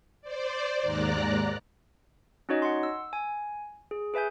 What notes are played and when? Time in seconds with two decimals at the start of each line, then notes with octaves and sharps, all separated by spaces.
0.22 C5 D5
0.82 D#2 G#2 D5 A#5 F#6
2.49 C#4 D#4 F#4 C#5 D#5
2.62 F#5 C6
2.83 E6
3.13 G#5
3.91 G#4
4.14 G#4 B4 E5 G#5 G6